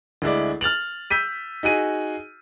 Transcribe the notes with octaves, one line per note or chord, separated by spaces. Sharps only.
D2 G#3 E4 D5
F6 A6 F7 F#7
E6 G6 B6 D#7
D#4 F#4 G#4 D#7